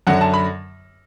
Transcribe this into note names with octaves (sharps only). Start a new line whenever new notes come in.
F#2 D3 F#3 F#5
A5
B5